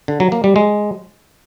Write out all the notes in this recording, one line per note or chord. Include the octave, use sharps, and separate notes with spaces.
D3
F#3
A#3
G3
G#3